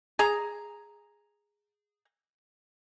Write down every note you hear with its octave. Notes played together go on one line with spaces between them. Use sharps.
G#4 A#5